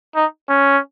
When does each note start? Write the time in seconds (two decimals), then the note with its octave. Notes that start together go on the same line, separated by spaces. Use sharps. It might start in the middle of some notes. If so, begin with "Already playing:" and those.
0.16 D#4
0.49 C#4